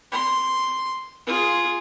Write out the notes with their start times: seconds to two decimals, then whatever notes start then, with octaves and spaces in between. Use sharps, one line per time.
0.12 C6
1.27 F4 G#4